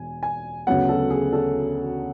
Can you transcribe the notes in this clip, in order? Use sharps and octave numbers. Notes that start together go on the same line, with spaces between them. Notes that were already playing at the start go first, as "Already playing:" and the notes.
Already playing: E1 G#5
G#5
D2 C#3 F#3 B3 F#5
A4
G#4
A4